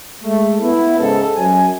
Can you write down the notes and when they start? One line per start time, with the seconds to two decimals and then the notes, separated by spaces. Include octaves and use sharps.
0.24 G#3 A3
0.62 B3 E4
0.99 G#2 C#3 A4
1.37 F#2 G#5